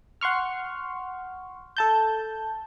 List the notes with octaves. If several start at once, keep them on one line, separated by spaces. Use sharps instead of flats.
F#5 C6 C#6 F6
A4 A5 G6